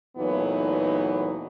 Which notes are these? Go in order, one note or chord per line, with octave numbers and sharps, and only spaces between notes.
D2 A#2 E3 F#3 B3 D#4